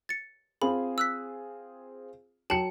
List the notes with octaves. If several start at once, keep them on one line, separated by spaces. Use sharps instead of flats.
A6 C#7
C4 F4 G#4 B5
E6 F#6 B6
F#3 G5 A5 C#7 F#7